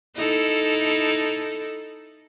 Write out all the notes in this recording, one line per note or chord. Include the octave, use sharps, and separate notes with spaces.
D#4 E4 A4